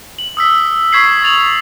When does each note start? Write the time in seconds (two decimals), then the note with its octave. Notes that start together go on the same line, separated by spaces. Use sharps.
0.19 F#7
0.37 D#6 E6 B6
0.92 C#6 G#6 B6 C7 F#7
1.22 D#6 A6 F7 F#7